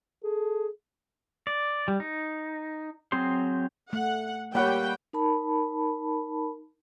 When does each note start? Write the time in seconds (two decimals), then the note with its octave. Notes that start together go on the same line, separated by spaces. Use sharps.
0.24 G#4 A4
1.47 D5
1.88 G3
2.00 D#4
3.12 F#3 C4 G#4 C5 C6
3.93 A3 F#5
4.55 G3 A#3 C#5 F#5 G5 B5
5.13 D#4 A#4 A5 B5